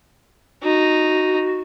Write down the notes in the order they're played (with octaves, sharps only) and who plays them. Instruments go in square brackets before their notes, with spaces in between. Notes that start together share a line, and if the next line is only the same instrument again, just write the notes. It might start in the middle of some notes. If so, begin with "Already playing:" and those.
[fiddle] D#4 [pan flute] F#4